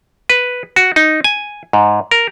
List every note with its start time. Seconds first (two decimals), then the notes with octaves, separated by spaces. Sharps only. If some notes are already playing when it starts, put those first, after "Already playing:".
0.30 B4
0.76 F#4
0.96 D#4
1.24 G#5
1.73 G#2
2.11 A#4